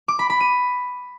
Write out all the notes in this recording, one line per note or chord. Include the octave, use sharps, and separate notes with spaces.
D6
B5
B5
D#7